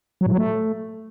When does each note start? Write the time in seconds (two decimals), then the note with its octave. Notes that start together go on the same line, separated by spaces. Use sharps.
0.21 F#3
0.26 A2
0.32 F#3
0.37 A3